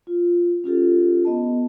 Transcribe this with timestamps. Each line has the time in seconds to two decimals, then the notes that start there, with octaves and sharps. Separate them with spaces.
0.07 F4
0.64 C#4 F4 G4 A4
1.25 B3 D#5 A5